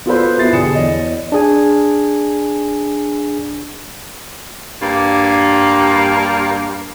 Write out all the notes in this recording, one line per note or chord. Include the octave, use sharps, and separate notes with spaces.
B3 F4 F#4 A4 B4 C5
F3 B3 E4 A6 C7
B1 D3 G4 G#4 C#7 E7
E2 C#5 D#5
D4 G#4 G#5
G2 A#3